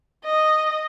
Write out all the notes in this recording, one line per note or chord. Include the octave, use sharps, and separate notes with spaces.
D#5